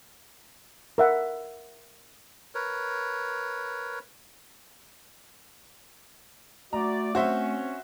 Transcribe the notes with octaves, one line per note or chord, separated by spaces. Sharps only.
A#4 E5 F#5
A#4 B4 C#5
A3 F#4 D5 A#5
C4 C#4 F#4 C5 E5